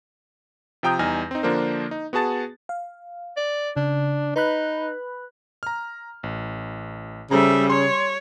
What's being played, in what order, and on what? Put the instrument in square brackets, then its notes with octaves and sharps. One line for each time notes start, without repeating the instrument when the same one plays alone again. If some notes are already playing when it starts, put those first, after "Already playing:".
[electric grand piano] C3 F3 G5 A#5 D#6 G6
E2 G3 D#4 G#5 F6 A#6
C4 D#4
D3 F3 A#3 D4 A#4 C5
D#4
B3 F#4 G#4 A5 A6
[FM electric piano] F5
[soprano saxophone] D5
[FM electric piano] C#3 [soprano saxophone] D4
[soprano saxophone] D#4 [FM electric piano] B4 B5 F#6
[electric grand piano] A#5 F6
A1
[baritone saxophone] C#3 [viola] G3 E5 [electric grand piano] A4 C5 A#5
[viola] C#5 [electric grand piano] C6